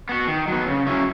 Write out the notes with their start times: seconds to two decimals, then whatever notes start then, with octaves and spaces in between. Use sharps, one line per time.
0.09 B3 F#4
0.28 D#3
0.47 F#3 B3
0.67 C#3
0.87 F#3 C#4 E4